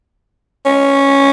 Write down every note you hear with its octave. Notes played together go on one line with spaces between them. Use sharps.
C#4